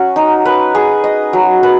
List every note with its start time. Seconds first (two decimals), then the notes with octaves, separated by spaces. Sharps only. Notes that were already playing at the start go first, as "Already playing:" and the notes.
Already playing: F#3 C#4 F#4
0.16 D#4
0.45 B4
0.75 G#4
1.04 D#5
1.33 F#3
1.63 B4